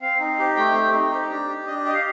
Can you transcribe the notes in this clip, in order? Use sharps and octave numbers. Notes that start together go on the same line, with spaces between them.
C4 F5
D#4
G4
A3 G5
C4
D#4
G4
D4
G4
D4 D#5
G4 D#5
F5